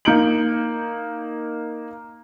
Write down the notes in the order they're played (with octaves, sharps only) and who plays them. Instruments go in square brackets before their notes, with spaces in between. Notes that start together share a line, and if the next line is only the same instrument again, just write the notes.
[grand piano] A#3 D#4 G6 C#7 D7 F#7